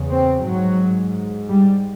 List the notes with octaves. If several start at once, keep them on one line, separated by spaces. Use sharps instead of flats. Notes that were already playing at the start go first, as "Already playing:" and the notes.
Already playing: E2 C#3
C4
G#2 F#3
G3